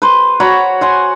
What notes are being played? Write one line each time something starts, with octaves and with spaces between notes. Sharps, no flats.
B4 C5
F#4 C#5 A#5 B5
C5 F#5 G#5